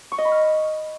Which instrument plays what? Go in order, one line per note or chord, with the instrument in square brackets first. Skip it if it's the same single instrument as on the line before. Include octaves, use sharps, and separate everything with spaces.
[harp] C#6
D#5
B5
F6